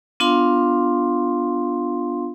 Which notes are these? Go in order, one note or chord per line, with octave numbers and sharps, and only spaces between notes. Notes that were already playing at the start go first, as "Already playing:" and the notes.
B3 D4 F4 F5 C6